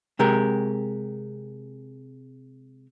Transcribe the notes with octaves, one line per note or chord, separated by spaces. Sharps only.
C3 G#3 G4 A#4